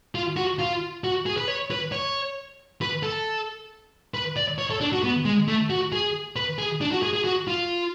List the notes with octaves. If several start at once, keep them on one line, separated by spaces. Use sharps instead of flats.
F4
F#4
F4
F#4
G#4
B4
C#5
B4
C#5
B4
A4
B4
D5
C#5
A4
D4
F#4
B3
G#3
A3
F#4
G#4
B4
G#4
D4
F#4
G#4
G#4
F#4
F4